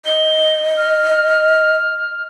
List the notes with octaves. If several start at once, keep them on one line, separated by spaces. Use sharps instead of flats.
D#5 G7
F6